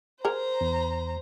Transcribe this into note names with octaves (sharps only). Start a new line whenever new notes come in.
G#4 A#4 C5 A#5
E2